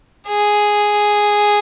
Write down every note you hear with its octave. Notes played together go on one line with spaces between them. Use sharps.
G#4